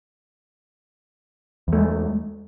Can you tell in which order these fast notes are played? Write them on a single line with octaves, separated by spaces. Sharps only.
E2 A3 G#3